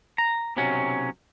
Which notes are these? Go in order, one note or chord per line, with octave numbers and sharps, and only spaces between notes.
A#5
B1 C3 F#3 C#4